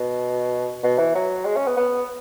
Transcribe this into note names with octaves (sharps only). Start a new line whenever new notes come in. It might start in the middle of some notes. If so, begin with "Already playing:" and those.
Already playing: B2
B2
E3
F#3
G#3
C#4
B3
B3